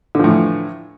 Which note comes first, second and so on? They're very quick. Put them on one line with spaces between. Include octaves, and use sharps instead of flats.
D3 F3 A2 E3